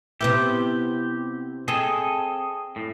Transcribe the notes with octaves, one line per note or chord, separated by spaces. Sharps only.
C3 B3 E4 G4
C4 G#4 A4 D#5
A2